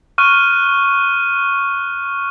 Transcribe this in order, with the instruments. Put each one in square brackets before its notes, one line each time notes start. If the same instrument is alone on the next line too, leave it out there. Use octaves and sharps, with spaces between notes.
[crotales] C#6 F6 F#6 D#7